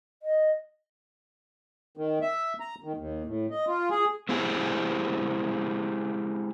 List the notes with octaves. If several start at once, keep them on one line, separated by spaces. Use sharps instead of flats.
D#5
D#3
E5
A#5
D#3
D#2
A2
D#5
F4
G#4
G#3 C4 E4 G4 G#4